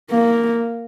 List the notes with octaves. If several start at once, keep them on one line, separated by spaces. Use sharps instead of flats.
A#3